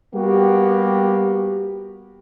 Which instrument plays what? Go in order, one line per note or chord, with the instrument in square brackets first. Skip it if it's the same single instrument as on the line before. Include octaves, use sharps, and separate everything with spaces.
[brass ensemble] G3 A#3 B3 F#4 G4